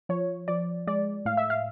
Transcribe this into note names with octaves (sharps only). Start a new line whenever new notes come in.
F3 C#5
F3 D5
G#3 D5
A2 F5
E5
F5